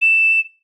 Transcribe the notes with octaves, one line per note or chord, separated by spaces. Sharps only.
E7